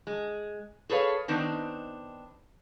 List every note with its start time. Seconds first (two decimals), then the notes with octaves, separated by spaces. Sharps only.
0.07 G#3
0.90 G#4 A4 B4 C#5 F5
1.28 D#3 B3 C4 D4 D#4